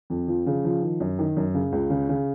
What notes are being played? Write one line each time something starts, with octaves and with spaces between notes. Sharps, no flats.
F2
F3
C#3
F3
D#3
F#2
D#3
F#2
C#3
C#2
C#3
C#3